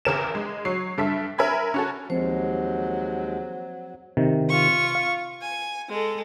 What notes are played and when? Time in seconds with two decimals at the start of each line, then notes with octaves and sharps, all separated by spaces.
0.05 A1 E2 A#4 E7
0.35 G#3
0.65 F#3 C#5 C7
0.98 G2 A4 E5 B6
1.38 A#4 E5 G#5 B5 G#6
1.74 C#4 F#4 A4
2.10 D#2 F3 F#3 G#3 C4 C5
4.17 C3 D#3
4.49 F4 C#6
4.95 F5
5.42 G#5
5.89 G#3 A4